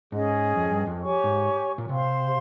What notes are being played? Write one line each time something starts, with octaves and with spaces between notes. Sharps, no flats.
G#2 C#4 G#4 D#5
F2
G2
F2
G4 C#5 G#5 C#6
G#2
A#2
C3 C5 F5 C6